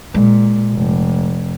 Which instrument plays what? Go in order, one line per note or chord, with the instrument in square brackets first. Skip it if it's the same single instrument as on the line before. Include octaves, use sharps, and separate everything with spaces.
[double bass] A#2 [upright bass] G#3
[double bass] F1